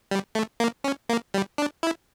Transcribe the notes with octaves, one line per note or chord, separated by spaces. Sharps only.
G3
A3
A#3
C#4
A#3
G3
D4
E4